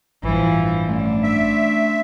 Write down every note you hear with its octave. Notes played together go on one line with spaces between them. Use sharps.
A1 G2 E3 F3
A3 C#4 D4
E5